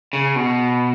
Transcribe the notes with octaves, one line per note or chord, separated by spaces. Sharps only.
C#3
B2